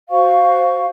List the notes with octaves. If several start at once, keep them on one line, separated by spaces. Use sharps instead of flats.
F#4 C5 F5 C#6